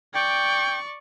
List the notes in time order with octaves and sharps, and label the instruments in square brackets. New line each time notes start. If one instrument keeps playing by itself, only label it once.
[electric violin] D5 C#6 [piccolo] G5